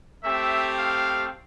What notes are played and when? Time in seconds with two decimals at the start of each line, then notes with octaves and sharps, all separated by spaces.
0.24 A3 C4 G4 E5
0.78 F5